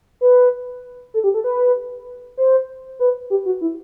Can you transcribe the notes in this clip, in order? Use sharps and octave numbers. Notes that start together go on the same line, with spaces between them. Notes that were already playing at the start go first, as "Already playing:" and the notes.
B4
A4
G4
A4
B4
C5
B4
G4
F#4
E4